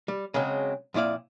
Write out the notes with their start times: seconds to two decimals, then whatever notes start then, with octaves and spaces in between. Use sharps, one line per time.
0.08 G3
0.34 C#3 F#3 G#3 C4
0.94 F2 A#2 E4 D5 F5